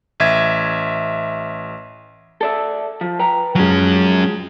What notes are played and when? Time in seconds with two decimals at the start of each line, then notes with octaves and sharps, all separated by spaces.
0.20 A1 E5 G#6
2.41 A4 D5 E5
3.01 F3
3.19 B4 G5 A#5
3.55 F3 F#3 G#3 C#4